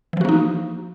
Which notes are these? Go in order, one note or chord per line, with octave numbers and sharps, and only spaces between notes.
E3 F3 A#3 D#4 F#4